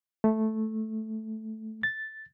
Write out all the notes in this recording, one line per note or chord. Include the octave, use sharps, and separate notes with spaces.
A3
A6